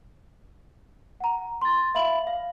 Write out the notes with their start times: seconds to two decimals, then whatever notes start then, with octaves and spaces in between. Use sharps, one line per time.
1.20 F#5 A#5
1.61 C6 A6
1.95 E5 F5 B5 F#7
2.27 F5